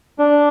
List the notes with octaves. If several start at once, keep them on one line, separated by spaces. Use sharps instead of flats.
D4